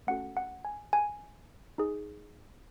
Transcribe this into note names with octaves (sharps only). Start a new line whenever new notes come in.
A3 C#4 F#4 A4 F#5
F#5
G#5
G#5
D#4 G#4